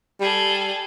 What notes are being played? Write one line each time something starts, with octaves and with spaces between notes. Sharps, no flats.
G3 G#4 A4